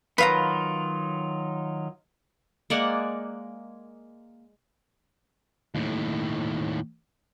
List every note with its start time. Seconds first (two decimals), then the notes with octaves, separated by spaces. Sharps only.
0.18 D#3 F#3 F4 B4 F5 A#5
2.70 G#3 A#3 D5 F#5
5.75 D#2 A2